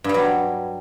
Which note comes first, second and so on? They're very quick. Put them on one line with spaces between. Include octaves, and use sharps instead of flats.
G2 G3 F#3